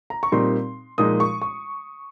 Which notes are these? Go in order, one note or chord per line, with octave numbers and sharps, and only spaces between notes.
A#5
C#6
A#2 G3 C4 D#4 C6
A#2 F3 G#3 D#4 D#6
C#6
C#6